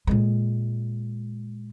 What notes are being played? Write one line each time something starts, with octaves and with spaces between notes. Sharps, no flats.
A#2 G#3